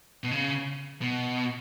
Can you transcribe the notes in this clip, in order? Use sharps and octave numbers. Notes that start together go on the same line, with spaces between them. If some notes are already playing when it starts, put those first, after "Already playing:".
B2
C#3
B2